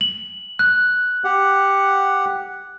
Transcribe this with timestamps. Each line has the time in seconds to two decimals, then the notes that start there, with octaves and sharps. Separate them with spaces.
0.01 F#7
0.59 F#6
1.24 G4 F#5